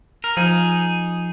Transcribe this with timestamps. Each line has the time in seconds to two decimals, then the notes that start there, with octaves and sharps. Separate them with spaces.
0.24 A#4
0.37 F3 D#4 G#4